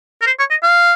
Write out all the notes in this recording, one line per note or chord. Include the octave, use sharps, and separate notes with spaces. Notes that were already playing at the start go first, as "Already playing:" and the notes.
A#4
C5
C#5
D#5
F5